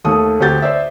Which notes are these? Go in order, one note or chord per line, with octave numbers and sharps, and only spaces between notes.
D#2 A3 D#6
D2 C4 F#4 G4 G6 A6
C5 D5 E5